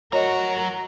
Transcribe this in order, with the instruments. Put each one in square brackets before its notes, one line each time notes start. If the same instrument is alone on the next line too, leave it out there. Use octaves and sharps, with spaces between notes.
[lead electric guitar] F#3 A#5 [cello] F#4 A#4 [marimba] C#5 D#5